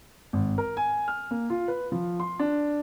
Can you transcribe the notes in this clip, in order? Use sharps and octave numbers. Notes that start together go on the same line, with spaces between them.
G#1
A#4
G#5
F6
A#3
F4
B4
F3
C6
D4